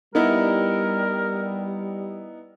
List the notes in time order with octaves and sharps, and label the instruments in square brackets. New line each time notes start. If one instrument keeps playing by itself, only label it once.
[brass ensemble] G3 [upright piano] B3 D#4 E4 [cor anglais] A#4